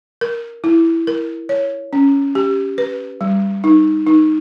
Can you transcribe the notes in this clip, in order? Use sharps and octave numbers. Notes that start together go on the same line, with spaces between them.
A#4
E4
A#4
C#5
C#4
G4
B4
G3
D#4
D#4